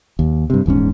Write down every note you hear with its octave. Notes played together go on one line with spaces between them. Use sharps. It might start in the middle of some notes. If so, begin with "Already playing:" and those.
D#2
G2 C3
D#1 E2 G#2 C#4